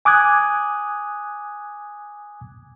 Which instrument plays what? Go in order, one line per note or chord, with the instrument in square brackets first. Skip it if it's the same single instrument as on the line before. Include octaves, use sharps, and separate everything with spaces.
[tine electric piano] G#5 D6 D#6 F#6 G#6